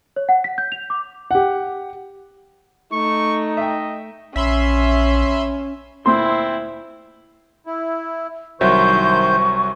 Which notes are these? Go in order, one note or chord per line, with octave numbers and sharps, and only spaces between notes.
C#5
F#5
B6
G6
F7
D6
G4 F#5
A3 D#4 C#6
D#5 E5 G5
A#1 C#4 E5 B5 C6
D2 A#2 C4 E4 C5 C6
E4
C2 D#3 F#3 C5 E5 C#6 G6